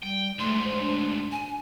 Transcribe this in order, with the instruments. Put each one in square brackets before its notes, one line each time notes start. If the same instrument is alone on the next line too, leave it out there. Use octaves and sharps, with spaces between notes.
[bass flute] G3 [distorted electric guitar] G5
[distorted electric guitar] D2 G#2 [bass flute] A3 [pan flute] C6
[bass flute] C5
D4
[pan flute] G#5